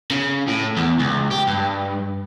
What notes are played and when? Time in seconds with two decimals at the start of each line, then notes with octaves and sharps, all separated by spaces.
0.11 C#3
0.47 A2
0.76 E2
0.99 C#2
1.31 G4
1.47 G2